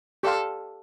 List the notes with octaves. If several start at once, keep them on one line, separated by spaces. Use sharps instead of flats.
G4 A4 D5 F5 C6